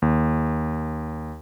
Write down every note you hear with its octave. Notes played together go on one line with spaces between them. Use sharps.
D#2